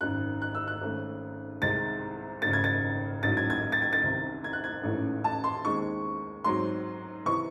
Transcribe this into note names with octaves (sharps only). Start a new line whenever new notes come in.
G#1 F#2 D#3 F#6
F#6
E6
F#6
G#1 G#2 D#3 A3 C#4
C2 C3 D#3 G#3 A6
G#1 F#2 C#3 A6
G#6
A6
A1 G#2 F#3 A6
G#6
G#6
A6
G#6
A6
C2 C3 D#3
G#6
F#6
G#6
A1 G#2 E3 A3 C#4
A5
C6
D#2 D#3 G#3 C4 C#6
G#2 F#3 C4 C6
C3 E3 C#6